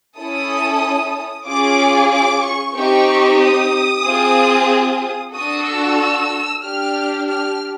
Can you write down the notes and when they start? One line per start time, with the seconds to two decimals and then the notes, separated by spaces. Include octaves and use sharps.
0.18 C#4 E4 A4 D#6
1.47 C#4 F4 G#4 D6
2.12 D6
2.44 C#6
2.75 C4 D#4 G4 C#6
3.40 D#6
4.05 C4 F4 G#4
5.34 D4 F#4 A4 D#6
5.67 E6
6.63 D4 G4 F6
7.27 F6